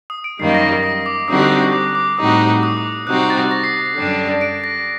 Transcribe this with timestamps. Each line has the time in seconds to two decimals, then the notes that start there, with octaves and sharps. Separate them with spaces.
0.10 D#6
0.24 D7
0.39 F#2 D#3 G3 A#3 D#4 C7
0.55 A#6
0.69 A#6
0.83 D#6
1.06 D6
1.28 D3 G3 C4 D#4 F#4 D#6
1.43 F#6
1.59 F#6
1.73 D6
1.95 D6
2.18 A2 G3 C4 D#4 F#4 D#6
2.63 D#6
2.77 D6
3.07 C3 G3 C4 D#4 F#4 F#6
3.30 A6
3.51 A#6
3.64 C7
3.86 C7
3.97 F#2 D3 G3 D4
4.41 D7
4.64 A#6